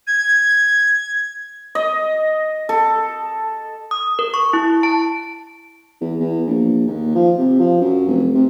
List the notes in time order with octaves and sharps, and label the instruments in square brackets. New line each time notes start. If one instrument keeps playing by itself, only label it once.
[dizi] G#6
[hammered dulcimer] D#5
A4
[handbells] D#6
A#4
C#6
E4
A5
[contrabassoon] E2
E2
A#1
D#2
F3
C3
F3
F#2
F1
C3